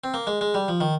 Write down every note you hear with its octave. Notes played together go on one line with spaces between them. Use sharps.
C4
A#3
G#3
G#3
G3
F3
D#3